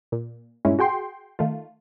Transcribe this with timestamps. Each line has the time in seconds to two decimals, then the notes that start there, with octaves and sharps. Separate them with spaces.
0.12 A#2
0.65 G2 A#2 G#3 C#4 E4
0.79 F#4 G#4 G5 C6
1.39 D#3 A3 F4